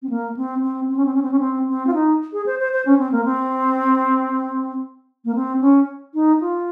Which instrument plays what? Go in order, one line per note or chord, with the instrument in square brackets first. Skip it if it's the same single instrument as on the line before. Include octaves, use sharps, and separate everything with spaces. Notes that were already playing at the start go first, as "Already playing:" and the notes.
[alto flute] C4
A#3
C4
C4
C4
C#4
C4
C#4
C4
C#4
C4
C4
F4
D#4
G#4
C5
C5
C5
C#4
C4
A#3
C4
A#3
C4
C#4
D#4
F4